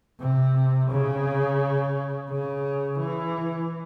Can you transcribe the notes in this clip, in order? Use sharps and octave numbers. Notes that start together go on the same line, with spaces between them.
C3
C#3
C#3
E3